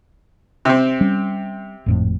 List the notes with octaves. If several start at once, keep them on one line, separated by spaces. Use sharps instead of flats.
C3 C4
G3 C#4
G#1 F2 A2